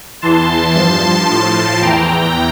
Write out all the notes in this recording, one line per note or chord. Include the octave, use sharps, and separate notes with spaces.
E2 E3 A5 C6
G2 F3 A5 C6
A2 F3
E2 E3 G5 A#5